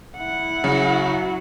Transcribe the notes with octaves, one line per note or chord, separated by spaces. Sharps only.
E4 F#5
C#3 F#3